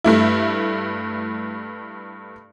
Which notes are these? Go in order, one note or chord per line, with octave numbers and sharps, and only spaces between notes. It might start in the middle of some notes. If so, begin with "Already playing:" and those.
G2 A3 E4